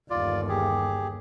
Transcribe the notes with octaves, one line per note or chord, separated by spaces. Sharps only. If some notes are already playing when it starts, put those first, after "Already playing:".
G1 D#2 F4 D5
G4 G#4